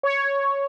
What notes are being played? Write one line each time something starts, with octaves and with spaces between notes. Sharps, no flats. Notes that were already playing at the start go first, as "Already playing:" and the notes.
C#5